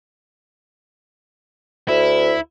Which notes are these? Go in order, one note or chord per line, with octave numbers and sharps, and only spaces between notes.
D2 E4